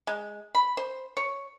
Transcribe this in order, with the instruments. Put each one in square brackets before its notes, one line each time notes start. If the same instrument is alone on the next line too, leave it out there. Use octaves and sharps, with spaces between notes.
[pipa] G#3
B5
C5
C#5